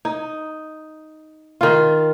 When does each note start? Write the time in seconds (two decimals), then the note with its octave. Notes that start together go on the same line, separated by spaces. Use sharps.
0.05 D#4
1.61 D#3 F4